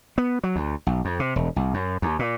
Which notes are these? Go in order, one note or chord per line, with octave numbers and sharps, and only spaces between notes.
B3
F#3
D2
B1
F2
C3
E1
C2
F#2
D#2
A#2